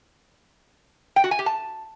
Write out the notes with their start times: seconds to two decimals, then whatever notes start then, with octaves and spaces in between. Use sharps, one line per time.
1.16 G5
1.24 F#4
1.31 G#5
1.39 G4
1.46 A5